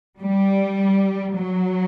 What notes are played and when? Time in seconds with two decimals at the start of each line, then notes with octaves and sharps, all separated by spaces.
0.20 G3
1.36 F#3